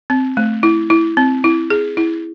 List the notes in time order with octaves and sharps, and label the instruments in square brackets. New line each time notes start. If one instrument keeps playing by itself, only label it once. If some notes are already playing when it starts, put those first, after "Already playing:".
[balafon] C4
A3
E4
E4
C4
E4
G#4
E4